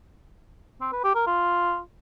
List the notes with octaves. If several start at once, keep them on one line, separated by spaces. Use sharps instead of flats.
C4
B4
G4
A#4
F4